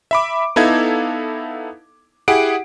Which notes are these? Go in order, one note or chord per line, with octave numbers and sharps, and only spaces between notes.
E5 B5 D6
B3 D#4 E4 A4 F5 G#6
E4 G4 G#4 F#5 D7